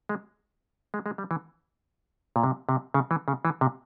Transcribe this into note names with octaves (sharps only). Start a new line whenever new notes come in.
G#3
G#3
G#3
G3
E3
A#2
C3
C3
C#3
E3
C#3
E3
C3